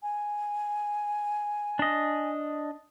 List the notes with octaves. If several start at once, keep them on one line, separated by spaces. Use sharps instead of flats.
G#5
D4 D#5